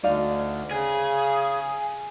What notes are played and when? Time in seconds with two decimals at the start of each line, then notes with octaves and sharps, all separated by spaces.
0.03 D2 D#4 D5 F5
0.71 C#3 G#4